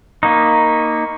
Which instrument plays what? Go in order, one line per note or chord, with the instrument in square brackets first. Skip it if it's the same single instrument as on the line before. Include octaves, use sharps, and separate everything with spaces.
[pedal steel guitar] A#3 D#4 [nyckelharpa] B5 C#6